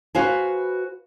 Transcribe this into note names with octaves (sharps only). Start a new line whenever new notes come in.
F#4 B4 C5 F5 G#5